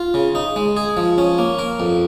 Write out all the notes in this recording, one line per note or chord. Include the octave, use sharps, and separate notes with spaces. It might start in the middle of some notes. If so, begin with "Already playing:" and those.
Already playing: F4
C#3
D#4
G#3
G#4
F3
C#4
A#3
A#4
F2